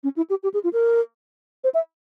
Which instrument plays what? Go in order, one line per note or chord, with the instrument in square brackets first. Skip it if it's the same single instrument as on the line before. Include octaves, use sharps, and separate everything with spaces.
[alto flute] C#4
E4
G4
G4
G#4
F4
A#4
C5
E5